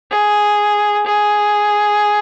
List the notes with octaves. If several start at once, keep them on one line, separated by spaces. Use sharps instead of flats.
G#4
G#4